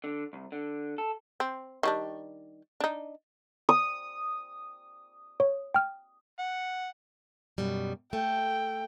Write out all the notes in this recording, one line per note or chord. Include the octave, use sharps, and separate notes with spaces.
D3
C2
D3
A4
C4
D#3 G3 D4
D4 D#4
D#6
C#5
G5 F6
F#5
F#2 B2 G3
A3 G5